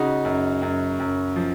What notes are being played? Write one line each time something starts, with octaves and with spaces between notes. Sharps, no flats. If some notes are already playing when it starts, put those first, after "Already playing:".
Already playing: C#3 D#4 F#4
F#2
F#2
F#2
F3